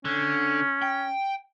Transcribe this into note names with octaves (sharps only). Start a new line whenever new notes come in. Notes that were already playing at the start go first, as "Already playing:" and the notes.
D3 C#4
G5